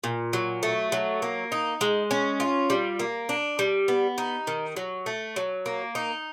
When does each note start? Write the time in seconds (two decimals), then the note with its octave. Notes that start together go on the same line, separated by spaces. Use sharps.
0.04 A#2
0.33 F#3
0.63 A3
0.92 F#3
1.22 A#3
1.52 D#4
1.81 G#3
2.11 C#4
2.40 F4
2.70 G3
2.99 A#3
3.29 D4
3.59 G3
3.88 B3
4.18 D#4
4.47 D#3
4.76 F#3
5.06 A3
5.36 F#3
5.66 A#3
5.95 D#4